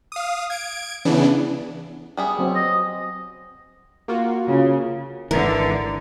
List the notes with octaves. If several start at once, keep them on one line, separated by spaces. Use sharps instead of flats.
F5 D#6
G#6 D7
C#3 E3 B3 D4
G3 B3 G#4
F#3 C4
D#5
A#3 F4 F#4
C#3
G#1 G#2 D3 E3 A#4